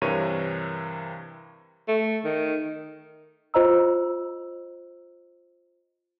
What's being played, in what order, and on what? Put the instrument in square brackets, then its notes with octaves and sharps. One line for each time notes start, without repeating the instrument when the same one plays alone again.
[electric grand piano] G2 C3 E3 A#4 C#5 D#7
[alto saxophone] A3
D#3
[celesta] F4 C5 D#5 A#5 E6